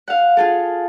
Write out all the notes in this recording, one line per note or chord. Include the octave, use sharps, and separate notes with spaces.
F5 F#5
F4 G#4 A4